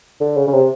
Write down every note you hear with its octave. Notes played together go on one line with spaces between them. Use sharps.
D3
C#3
C#3
C3